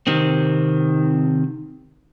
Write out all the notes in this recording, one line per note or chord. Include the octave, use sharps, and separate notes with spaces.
C3 D#3 C4